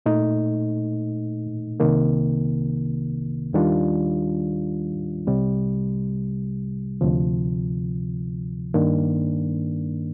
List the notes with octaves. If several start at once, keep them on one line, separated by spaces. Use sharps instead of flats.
A#2 A3 D#4
C2 C3 D#3 A#3
D#2 D#3 G3 D4 F4
C2 C3 G3
D2 C3 F3
G2 D#3 A#3 D4